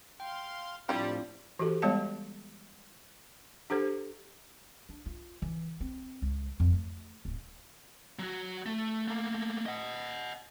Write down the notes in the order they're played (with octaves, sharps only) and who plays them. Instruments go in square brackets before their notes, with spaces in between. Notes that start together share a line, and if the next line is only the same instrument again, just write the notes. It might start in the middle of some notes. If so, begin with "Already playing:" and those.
[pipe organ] F5 C6 [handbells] G5
[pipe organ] A2 F3 [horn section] G3 [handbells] C4 D4 F4 [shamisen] E4 G4
[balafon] E3 F#4 G4 A4
G3 G#3 B3 C#5 F5 A5
D4 G4 A4 C5
[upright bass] D4
F4
E3
C4
C#2
F2
A3
D1
[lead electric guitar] F#3 F#4
A3
A3 A#3
D#5 F#5